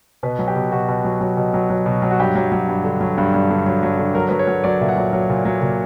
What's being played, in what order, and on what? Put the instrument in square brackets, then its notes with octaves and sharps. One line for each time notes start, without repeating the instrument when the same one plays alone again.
[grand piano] B2 B4
F#3
G4
B2
B2 F#4
B2
F#3
F#3
B2
F#3
F#3
B2
F#3
F#4
G2 G4
F#3
F#3
G2
D3
F#3
G2
G2
D3
F#3
F#3
D3
F#3 A#4
F#3 B4
C#5
F#3
F#3 D5
A#2 E5
F#5
F#3
F#3
A#2
F#3
A#2